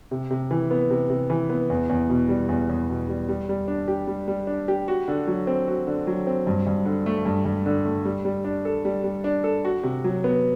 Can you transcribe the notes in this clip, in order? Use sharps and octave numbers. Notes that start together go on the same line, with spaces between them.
C3
C3
E3
B3
C3
C3
E3
B3
E2
E2
B2
G3
E2
E2
B2
G3
G3
G3
D4
G4
G3
G3
D4
G4
F#4
D3
F#3
C4
F#4
D3
F#3
C4
G2
G2
D3
A3
G2
G2
D3
A3
G3
G3
D4
A4
G3
G3
D4
A4
F#4
C3
F#3
B3